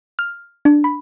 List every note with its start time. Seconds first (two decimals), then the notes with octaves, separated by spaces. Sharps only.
0.19 F6
0.65 D4
0.84 B5